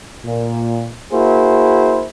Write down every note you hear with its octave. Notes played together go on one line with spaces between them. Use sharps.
A#2
A#3 E4 F#4 G#4 C5